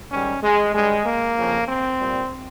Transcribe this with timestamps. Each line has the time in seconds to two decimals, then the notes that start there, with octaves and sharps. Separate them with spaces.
0.12 G#2 D#3 G3 C#4
0.43 G#3
0.75 G2 G3 G#3
1.06 A#3
1.37 F2 C#3 F3
1.68 C4
2.00 A#2 G3